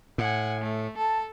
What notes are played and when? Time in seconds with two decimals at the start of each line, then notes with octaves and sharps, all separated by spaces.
0.18 A2 F#5 G#5
0.61 A3
0.97 A4 A5